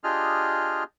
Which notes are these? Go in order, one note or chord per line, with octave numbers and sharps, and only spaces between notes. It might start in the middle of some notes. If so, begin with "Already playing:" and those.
D4 F4 G4 G#4 D#5 F6